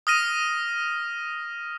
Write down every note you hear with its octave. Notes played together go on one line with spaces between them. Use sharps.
D#6 F6 A#6 D#7